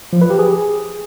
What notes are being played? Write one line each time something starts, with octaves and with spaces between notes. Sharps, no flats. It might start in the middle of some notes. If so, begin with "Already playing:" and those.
F3
B4
G4
G#4